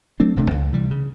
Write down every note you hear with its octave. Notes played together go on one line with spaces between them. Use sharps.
F#3 A3 C4 D4
D#1 C3 A3 D4
C#2
C3 E3 G3
C#3